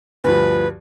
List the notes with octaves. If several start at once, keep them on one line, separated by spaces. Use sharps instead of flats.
D2 G2 F3 B4